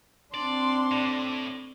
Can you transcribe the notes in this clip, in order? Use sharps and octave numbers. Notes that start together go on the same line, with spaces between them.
C4 D4 D5 C6
A2